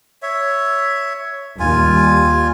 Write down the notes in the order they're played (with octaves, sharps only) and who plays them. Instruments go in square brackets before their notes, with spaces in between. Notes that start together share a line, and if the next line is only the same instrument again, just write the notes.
[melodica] C#5 E5
[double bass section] D#2 G3 [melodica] F4 G#5